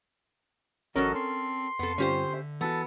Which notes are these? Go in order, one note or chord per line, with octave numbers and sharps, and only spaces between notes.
A1 F#3 C#4 A4 A#4 D#5
C4 C6
F2 B3 A4
G2 D3 C4 C#4 F4 G4 C5
E5
E3 B3 F#4 A4